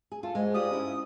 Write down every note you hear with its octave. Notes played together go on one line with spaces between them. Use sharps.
G#4
F4 A4
G#2 G#3
F4 G4 D5 D#6
C#4 E4